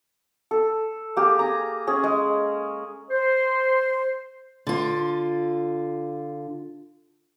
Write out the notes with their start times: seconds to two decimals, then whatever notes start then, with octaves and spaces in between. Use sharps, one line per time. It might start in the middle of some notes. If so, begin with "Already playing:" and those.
0.51 A4
1.16 A#3 G4 G#4
1.39 G#5 A#5
1.87 C#4 G#4
2.04 G#3
3.11 C5
4.67 D3 F4